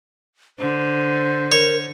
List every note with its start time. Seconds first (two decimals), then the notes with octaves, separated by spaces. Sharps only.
0.59 D3 C5
1.52 A#4 C#5